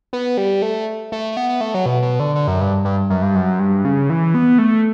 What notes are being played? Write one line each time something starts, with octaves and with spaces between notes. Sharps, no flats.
B3
G3
A3
A3
A3
B3
B3
A3
F#3
B2
B2
D3
D3
F#2
G2
G2
F#2
G2
F#2
G2
C#3
E3
B3
A3